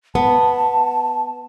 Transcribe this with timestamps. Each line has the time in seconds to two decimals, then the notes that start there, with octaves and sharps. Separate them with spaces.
0.15 B3 A5